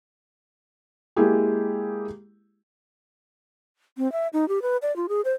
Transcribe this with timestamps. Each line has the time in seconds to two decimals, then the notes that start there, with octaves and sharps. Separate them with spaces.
1.16 G#3 A#3 E4 G4 G#4
3.98 C4
4.12 E5
4.33 D#4
4.48 G4
4.62 B4
4.82 D5
4.96 F4
5.09 G#4
5.25 C5